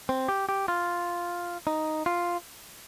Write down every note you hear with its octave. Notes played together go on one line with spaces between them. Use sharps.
C4
G4
G4
F4
D#4
F4